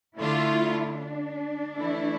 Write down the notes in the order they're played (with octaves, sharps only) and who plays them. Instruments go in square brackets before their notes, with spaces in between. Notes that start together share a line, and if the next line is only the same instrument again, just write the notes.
[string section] D3 A3 D4 F4 [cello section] E4
[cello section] D4
[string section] E3 A3 E4